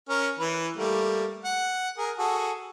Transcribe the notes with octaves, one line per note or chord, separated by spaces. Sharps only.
C#4 A#4 F6
E3 B4
G3 A3 A#3
F#5
G#4 A#4
F#4 G#4 A4